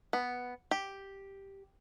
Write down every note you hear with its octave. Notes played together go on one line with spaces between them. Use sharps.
B3
G4